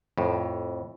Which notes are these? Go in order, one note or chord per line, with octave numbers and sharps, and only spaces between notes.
F2 A2